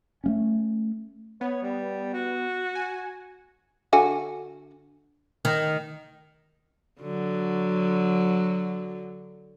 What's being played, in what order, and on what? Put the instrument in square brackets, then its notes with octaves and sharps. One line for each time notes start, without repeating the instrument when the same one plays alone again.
[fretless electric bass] A3 A#3 C#4
[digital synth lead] B3 [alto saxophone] C#5
[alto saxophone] G3
F#4
[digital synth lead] G#5
[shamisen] D3 F#4 G#5
[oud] D#3
[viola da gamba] D3 F#3